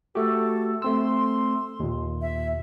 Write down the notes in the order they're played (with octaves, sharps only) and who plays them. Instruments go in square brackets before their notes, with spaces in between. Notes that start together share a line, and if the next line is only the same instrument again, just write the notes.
[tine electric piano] A3 F#4 G4 [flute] A4
[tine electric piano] A3 C4 E6 [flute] C6
[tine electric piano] D#2 A#2
[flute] E5